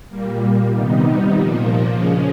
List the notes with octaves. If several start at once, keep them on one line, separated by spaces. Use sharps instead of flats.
A#2 G3 A#3
C3 D#3 G3 B3 D#4
A#2 F3 A#3
C#3 F3 G#3 C#4